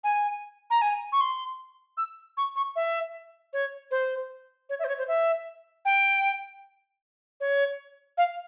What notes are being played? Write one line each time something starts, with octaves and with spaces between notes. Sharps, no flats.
G#5
A#5
G#5
C#6
C6
E6
C#6
C#6
E5
C#5
C5
C#5
E5
C5
C#5
C5
E5
G5
C#5
F5